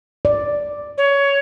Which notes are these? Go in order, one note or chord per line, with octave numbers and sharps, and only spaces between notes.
D5
C#5